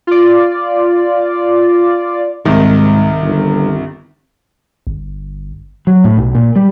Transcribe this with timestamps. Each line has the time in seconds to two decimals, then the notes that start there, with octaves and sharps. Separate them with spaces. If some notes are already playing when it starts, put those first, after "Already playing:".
0.07 F4 D5
2.45 C2 G#2 D#3
3.22 G1
4.87 G1
5.87 F#3
6.04 A2
6.17 B1
6.35 A#2
6.56 G3